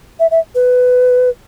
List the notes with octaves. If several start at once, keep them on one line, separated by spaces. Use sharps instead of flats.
E5
E5
B4